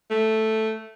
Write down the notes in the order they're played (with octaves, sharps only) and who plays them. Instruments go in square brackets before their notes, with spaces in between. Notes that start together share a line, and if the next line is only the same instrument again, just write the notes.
[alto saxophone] A3